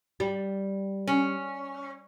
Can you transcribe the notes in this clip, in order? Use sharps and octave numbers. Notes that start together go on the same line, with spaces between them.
G3
C#4